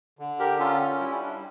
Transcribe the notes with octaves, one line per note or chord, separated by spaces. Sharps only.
D3
G4 A#4
C#4 F4 A4
G3 E4
D4